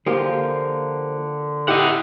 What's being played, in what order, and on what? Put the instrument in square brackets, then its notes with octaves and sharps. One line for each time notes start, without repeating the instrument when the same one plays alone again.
[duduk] D3 [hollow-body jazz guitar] F3 A#3 G4
[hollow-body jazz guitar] E4 [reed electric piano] G4 [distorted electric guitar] D#5 F#5